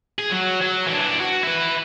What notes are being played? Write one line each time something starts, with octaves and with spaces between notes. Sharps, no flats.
G#4
F#3
F#3
E3 D4
F#4
E4 B4